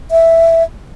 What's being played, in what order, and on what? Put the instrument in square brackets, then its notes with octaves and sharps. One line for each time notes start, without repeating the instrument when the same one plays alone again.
[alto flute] E5